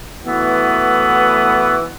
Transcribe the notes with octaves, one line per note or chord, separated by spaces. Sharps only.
A2 E3 B3 F#4